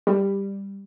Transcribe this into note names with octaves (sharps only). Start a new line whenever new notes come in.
G3